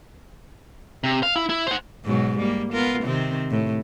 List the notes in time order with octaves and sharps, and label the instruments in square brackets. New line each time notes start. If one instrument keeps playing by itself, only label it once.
[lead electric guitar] C3
F5
E4
E4
C5 F#5
[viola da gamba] G#2 B2 F#3
G3 A#3
B3 F4 A#4
C3 D#3 C4
A2